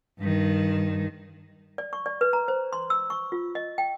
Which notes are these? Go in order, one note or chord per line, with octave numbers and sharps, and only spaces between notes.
G2 D#3
D5
C#6
D5
B4
A#5
C5
C6
E6
C#6
F4
D#5
G5